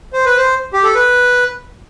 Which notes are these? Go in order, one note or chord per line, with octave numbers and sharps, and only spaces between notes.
C5
B4
C5
G4
A4
B4